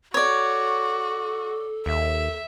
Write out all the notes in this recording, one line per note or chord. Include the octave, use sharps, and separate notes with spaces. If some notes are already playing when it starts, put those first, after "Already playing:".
F#4 A4 C#5 D5
D#2 E5